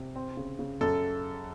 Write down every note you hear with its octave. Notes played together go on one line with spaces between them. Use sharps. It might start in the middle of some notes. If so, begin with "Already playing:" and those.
Already playing: C3
C4
C#3
C#3
F#2 A4